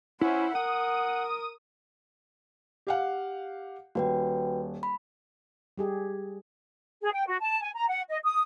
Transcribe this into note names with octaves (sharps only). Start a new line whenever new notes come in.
C#4 E4 C5 F#5
A#4 F#5 D#6
G4 F5 F#5
D#1 F#4 B4 G5
B5
G3 G4 G#4
G#4
G5
F#4
A5
G#5
A#5
F#5
D#5
D#6